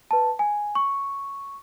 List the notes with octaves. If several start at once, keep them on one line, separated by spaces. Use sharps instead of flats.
B4 A5
G#5
C#6